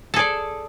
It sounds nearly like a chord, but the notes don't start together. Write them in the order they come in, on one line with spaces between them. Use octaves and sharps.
A4 G#4 D5